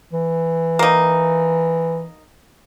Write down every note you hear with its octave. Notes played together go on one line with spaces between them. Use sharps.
E3
A#3 D#4